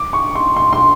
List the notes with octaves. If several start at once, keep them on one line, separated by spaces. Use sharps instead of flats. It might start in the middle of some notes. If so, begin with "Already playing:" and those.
Already playing: D6
C#6
C6
C6
C6